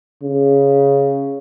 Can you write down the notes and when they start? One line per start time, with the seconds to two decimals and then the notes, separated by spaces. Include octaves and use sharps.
0.23 C#3